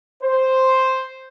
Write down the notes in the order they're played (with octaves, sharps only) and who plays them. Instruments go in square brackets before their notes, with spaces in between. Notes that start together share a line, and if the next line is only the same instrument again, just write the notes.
[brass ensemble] C5